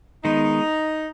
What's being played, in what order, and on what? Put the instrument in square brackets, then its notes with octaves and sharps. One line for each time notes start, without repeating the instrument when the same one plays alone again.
[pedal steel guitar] D#3 G#3 B3 [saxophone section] D#4